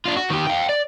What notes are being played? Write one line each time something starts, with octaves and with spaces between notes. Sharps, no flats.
D4 F4
F#4
D#3 G4
F5 G5
D5